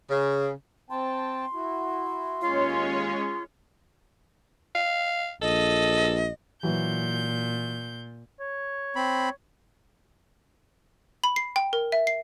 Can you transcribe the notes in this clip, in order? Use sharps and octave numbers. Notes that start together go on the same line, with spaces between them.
C#3
C4 G5 A5 C6
E4 F#4
D#2 G#3 C#4 F4 C#5 F5
F5
A#1 A4 D#5
A#2 E3 F#3 G6
C#5
C4 B5
B5
C7
G5
A#4
E5
C7